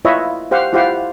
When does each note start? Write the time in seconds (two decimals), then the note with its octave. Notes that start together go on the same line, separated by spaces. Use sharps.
0.05 E4 F4 B4 C#5 D#5 E5
0.51 G4 C5 F5 F#5
0.73 E4 F4 G4 C5 F5 F#5